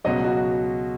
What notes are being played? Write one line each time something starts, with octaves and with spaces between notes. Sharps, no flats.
C#2 B2 F#3 D#5
F#4